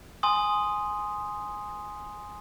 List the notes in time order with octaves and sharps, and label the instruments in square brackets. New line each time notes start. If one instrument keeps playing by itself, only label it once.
[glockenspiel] G#5 C6 D#6